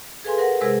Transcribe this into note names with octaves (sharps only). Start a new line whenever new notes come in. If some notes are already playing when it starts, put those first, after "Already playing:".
G#4 A4 B4 F5 G#5 C6
A#4 B4 F#5
C3 G#3 G#4 A#4 C5 E6